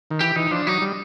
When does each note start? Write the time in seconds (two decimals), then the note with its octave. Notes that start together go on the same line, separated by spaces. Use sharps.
0.11 D#3
0.20 E3 G4
0.36 E3 D#4
0.51 F3 D4
0.67 F#3 D#4
0.82 G3